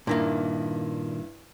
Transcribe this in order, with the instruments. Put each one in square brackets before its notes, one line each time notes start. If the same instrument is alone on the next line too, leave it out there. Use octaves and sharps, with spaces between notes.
[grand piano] G2 E4 [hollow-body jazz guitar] A#2 D#3 A#3